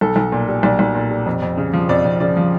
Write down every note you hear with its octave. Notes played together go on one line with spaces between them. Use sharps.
B1 A4
B1
A#2
G3
B1 D5
B1
A#2
G3
F2
F2
C#3
F3
F2 D5
F2
C#3 D5
F3